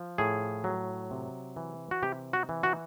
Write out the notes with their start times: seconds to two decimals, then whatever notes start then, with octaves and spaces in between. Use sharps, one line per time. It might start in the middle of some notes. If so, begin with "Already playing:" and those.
Already playing: F3
0.18 A2 G#4
0.64 F#3
1.11 C3
1.56 E3
1.91 F#4
2.02 C3 G4
2.33 F#4
2.49 E3
2.63 F#4